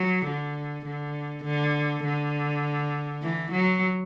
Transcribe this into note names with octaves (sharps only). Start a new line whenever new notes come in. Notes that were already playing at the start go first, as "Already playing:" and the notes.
Already playing: F#3
D3
D3
D3
D3
E3
F#3